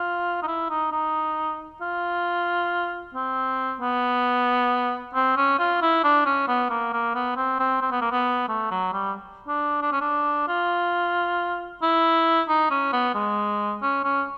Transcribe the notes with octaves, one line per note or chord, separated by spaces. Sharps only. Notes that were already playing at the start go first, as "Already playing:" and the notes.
Already playing: F4
D#4
E4
D#4
D#4
F4
C4
B3
C4
C#4
F4
E4
D4
C#4
B3
A#3
A#3
B3
C4
C4
C4
B3
A#3
B3
A3
F#3
G3
D4
D4
C#4
D4
F4
E4
D#4
C#4
B3
G#3
C#4
C#4